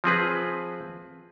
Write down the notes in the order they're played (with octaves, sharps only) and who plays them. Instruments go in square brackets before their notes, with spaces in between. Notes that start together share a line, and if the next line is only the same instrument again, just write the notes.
[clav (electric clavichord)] F3 C4 G#4 B4